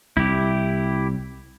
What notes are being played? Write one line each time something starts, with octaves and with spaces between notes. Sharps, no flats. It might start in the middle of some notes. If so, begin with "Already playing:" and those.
C2 E4 G4